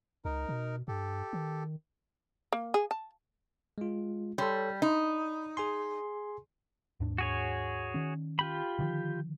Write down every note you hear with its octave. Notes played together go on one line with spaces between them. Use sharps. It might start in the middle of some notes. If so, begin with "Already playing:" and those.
C#2 D#4 A#4
B2
G2 G4 A4
D#3
A#3
G#4
A5
G#3 F4
G3 A4 C#5
D#4 B5
G#4 G#5 C6
D#2 G#2 D4
F#4 G#4 C#5
D#3 C#4
F4 G4 B5
D3 D#3 F3